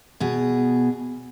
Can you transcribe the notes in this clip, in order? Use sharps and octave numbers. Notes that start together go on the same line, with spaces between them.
B2 G#4